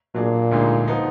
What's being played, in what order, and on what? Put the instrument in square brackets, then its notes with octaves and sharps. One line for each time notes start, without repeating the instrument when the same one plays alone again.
[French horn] A#2 [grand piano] F#3 D4 G#4
[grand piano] D2 D3 G#3 D#4
F3 B3 D#4